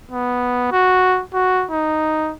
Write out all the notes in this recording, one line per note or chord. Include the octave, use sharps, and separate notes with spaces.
B3
F#4
F#4
D#4